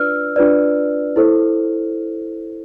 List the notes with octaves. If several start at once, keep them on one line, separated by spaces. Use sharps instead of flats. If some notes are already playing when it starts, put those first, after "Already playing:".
Already playing: D4 F4 B4 D5 E6 F6
D4 F4 B4 D5
E4 A4 C5